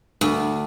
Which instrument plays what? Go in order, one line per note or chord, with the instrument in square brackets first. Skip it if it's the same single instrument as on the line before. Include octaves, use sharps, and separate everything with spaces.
[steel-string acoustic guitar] D2